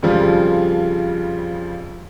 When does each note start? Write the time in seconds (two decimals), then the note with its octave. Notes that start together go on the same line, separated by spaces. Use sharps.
0.03 F2 C#3 F3 G3